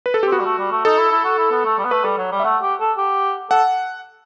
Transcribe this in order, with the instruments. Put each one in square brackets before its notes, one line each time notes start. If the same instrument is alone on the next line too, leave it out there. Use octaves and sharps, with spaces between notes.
[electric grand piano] B4
A4
G4
[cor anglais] C4
[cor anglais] B3 [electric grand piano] F#4
[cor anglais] G3
A3
G3
A3
[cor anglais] D#4 [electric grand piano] A4
[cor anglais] E4
E4
F#4
E4
B3
A3
G3
B3
[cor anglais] A3 [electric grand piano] B4
[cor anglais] G3 [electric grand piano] A4
[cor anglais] F#3
G3
[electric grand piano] E5
[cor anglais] A3 [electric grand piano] F#5
[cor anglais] G4
A4
G4
[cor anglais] A4 [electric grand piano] F#5